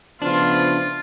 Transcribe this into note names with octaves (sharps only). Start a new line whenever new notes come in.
C#3 F3 A3 B3 D4 F4